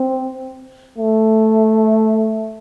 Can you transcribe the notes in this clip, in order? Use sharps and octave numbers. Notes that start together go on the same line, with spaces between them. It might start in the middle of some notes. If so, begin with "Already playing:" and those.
Already playing: C4
A3